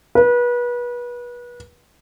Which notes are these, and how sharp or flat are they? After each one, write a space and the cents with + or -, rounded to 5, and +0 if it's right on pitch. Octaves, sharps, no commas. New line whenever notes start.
B4 -30